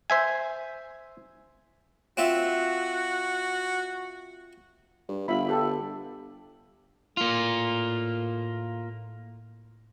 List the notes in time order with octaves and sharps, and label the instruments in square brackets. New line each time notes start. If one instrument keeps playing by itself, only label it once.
[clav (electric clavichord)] C5 E5 G#5
[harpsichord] C4 F4 E5 [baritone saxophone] F#4
[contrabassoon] G2
[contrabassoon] G1 [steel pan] F4 E5 B5
[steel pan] G4 A4
[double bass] A2 [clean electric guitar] A#3 F4